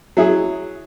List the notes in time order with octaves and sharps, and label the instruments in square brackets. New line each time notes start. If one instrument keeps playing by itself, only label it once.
[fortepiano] F#3 E4 G#4